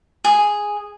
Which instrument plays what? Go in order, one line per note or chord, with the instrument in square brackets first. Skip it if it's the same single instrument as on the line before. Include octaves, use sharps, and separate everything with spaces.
[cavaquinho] G#4